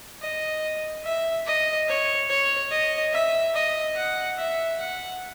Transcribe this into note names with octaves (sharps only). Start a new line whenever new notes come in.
D#5
E5
D#5
C#5
C#5
D#5
E5
D#5
F#5
E5
F#5